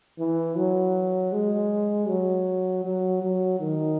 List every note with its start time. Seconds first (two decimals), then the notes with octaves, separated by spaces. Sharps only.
0.19 E3
0.57 F#3
1.32 G#3
2.08 F#3
2.85 F#3
3.22 F#3
3.60 D#3